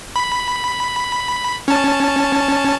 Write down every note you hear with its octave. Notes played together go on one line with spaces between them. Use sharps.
B5
C#4 A5